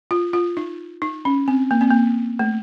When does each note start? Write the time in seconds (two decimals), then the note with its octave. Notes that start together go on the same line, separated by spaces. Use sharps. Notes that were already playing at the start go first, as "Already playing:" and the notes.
0.11 F4
0.33 F4
0.57 D#4
1.02 D#4
1.25 C#4
1.48 C4
1.71 A#3
1.81 C4
1.91 A#3
2.39 A3